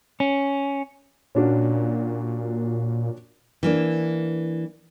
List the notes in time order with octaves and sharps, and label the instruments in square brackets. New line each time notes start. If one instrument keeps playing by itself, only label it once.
[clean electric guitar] C#4
[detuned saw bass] A#2 [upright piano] C#4 D4 F#4
[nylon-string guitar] E3 A#3 D4